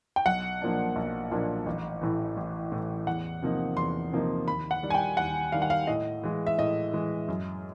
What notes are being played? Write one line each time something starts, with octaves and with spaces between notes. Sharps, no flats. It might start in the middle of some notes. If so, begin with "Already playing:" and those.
G5
B1 F#5
A#2 F3 A#3 D4
B1
A#2 F3 A#3 D4
A1
A2 E3
A1
A2 E3
E2 F#5
C3 F3 A#3 D#4
E2 C6
C3 F3 A#3 D#4
D#2 B5
F#5
D#3 G3
G#5
G5
D#2 F#5
D#3 G3 F5
F#5
F5
A2 D#5
E3 G#3
E5
A2 D#5
E3 G#3
F#2